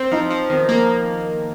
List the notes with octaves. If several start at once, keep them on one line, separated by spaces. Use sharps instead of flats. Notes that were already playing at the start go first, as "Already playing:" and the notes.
Already playing: C4
F3 D#4
F3
D#3 C4
A#3